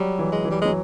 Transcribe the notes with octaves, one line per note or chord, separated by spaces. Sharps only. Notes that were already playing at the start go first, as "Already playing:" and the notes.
Already playing: F#3 G3
E3
G#3
E3
G3
F#3 G#3